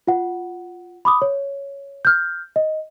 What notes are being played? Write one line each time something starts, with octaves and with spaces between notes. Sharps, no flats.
F4 F#5
B5 D6 D#6
C#5
F6 G6
D#5